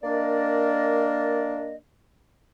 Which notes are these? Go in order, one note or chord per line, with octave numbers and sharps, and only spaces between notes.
A#3 D4 A#4 D5 D#5